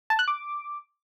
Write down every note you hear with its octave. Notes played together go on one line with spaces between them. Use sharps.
A5
F#6
D6